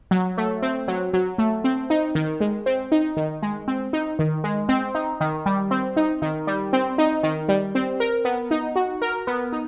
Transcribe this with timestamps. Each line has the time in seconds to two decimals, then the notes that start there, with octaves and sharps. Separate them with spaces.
0.11 F#3
0.38 A3
0.62 C4
0.88 F#3
1.13 F#3
1.38 A3
1.64 C4
1.90 D#4
2.15 D#3
2.40 G#3
2.66 C4
2.92 D#4
3.17 D#3
3.42 G#3
3.68 C4
3.93 D#4
4.19 D#3
4.44 G#3
4.69 C4
4.95 D#4
5.21 D#3
5.46 G3
5.71 C4
5.97 D#4
6.22 D#3
6.47 G3
6.73 C4
6.98 D#4
7.23 D#3
7.49 G3
7.75 C4
8.00 A#4
8.25 B3
8.51 D#4
8.76 F#4
9.02 A#4
9.27 B3
9.53 D#4